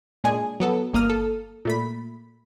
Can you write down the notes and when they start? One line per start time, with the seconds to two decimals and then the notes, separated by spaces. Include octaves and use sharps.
0.24 A#2 G#3 D4 G#4 G#5
0.60 F#3 B3 A4
0.93 G1 A#3 D#6 F6
1.10 A4
1.65 A#2 A3 B5